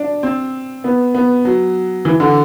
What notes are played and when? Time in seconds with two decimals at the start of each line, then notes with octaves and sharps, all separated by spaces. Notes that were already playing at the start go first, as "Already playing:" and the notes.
Already playing: D4
0.23 C4
0.84 B3
1.14 B3
1.45 F#3
2.05 E3
2.20 D3